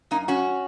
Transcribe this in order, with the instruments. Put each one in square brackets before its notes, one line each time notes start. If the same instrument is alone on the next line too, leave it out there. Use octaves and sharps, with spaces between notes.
[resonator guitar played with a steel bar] F#2 A#3 D#4
C#4 F#4